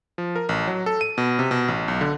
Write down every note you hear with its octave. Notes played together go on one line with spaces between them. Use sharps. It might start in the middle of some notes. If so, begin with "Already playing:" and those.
F3
A#4
A1
F#3
A4
D#7
B2
C3
B2
A1
B1
D3